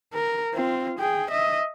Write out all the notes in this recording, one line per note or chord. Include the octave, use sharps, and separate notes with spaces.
A#4
C4 F4
G#4 G5
D#5 E5